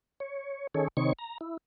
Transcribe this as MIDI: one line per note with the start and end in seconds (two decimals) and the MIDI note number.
0.20 0.67 73
0.74 0.88 51
0.74 0.88 61
0.74 0.88 68
0.74 0.88 69
0.74 0.88 73
0.97 1.13 48
0.97 1.13 51
0.97 1.13 60
0.97 1.13 63
0.97 1.13 73
0.97 1.13 85
1.19 1.38 82
1.41 1.57 64